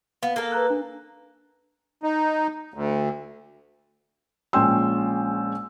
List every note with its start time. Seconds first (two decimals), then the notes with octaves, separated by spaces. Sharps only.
0.23 B3 F5
0.36 A#3 A4
0.52 B4 A#5 F#6
0.70 D4
2.03 D#4
2.74 D2
4.53 A#1 G#3 C#4 G5 C6 E6